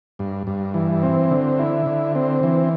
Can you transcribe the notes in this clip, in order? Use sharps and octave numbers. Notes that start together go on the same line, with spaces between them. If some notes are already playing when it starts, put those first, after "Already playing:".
G2
G2
E3
C4
D3
E4
D3
C4
E3